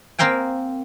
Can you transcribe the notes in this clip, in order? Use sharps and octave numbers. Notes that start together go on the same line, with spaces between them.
A#3 C4 A#4 F5 G5 G#5